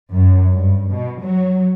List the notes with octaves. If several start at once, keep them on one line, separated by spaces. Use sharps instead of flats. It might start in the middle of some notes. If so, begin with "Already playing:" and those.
F#2
G2
B2
F#3